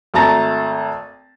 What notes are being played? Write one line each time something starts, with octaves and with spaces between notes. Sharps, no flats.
G#1 A3 A5 A#5 A6 A#6